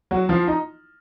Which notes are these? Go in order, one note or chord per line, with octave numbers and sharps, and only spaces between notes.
F#3 F#4
F3 F4
D#4